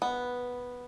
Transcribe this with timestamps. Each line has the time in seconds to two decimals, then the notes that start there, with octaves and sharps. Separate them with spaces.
0.02 B3